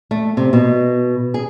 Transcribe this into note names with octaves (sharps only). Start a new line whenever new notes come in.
A3
C3
B2
G#4